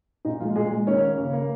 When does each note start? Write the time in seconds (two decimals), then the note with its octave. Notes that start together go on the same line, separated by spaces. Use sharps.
0.25 A#2 D#4
0.40 F3 G#3 F4
0.56 A#2 G#3 G#4
0.71 G#3
0.87 D#3 C#4 C#5
1.02 A#3
1.18 C#3
1.33 A#3